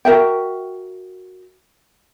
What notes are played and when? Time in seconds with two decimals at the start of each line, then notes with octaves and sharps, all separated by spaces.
0.05 F#4 A#4 E5 G5